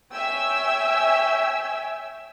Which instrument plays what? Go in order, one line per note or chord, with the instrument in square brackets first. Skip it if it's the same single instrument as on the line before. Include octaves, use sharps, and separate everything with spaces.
[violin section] C#5 E5 G5 G#5 E6